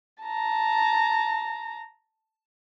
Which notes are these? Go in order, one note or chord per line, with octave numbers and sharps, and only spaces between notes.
A5 A#5